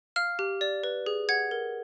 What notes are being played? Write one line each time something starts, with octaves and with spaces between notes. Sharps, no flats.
F5 F6
G4
D5
B4
G#4
F#5 G#6
A#4